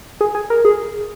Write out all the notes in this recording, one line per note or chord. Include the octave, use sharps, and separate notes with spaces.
G#4
G#4
A#4
G#4